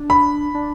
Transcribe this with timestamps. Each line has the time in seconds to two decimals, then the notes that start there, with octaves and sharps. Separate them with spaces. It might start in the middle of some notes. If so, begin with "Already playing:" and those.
Already playing: D4
0.10 B5
0.54 D4